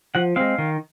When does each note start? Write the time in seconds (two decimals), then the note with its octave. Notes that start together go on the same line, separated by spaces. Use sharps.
0.15 F3 F#5
0.36 G#3 C4 F5
0.59 D#3